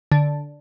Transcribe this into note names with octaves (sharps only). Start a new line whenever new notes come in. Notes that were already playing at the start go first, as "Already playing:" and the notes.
D3